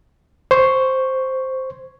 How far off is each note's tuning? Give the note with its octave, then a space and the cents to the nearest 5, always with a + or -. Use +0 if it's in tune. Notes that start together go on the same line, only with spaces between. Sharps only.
C5 +0 C#6 +0